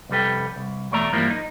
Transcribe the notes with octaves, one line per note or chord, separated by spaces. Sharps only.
C2 F2 G3 A4 B4 G5
C2
E2 B2 A3 D5 E5 A#5
G2 E3 F3 G3 A#3 E4
D#4